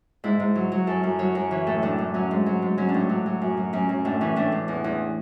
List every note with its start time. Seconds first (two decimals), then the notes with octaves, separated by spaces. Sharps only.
0.24 G#2 E4
0.40 G#2
0.55 F#3
0.72 F#3
0.87 F#2 A4
1.03 F#2
1.19 F#3 C#5
1.35 F#2
1.51 E3 C#5
1.67 A2 A4
1.82 A2 D4
1.98 A2
2.14 F#3 C#4
2.31 G#2
2.46 F#3
2.62 G#2
2.77 F#3 C#4
2.89 D4
2.94 A2
2.99 D4
3.09 F#3
3.26 F#3
3.41 F#2
3.57 F#3
3.73 F#2 C#4
3.89 F#2
4.05 A2 D4
4.21 E3 C#4
4.36 A2 D4
4.52 A2
4.68 E2
4.84 E2